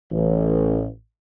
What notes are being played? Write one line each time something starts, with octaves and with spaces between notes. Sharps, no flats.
A1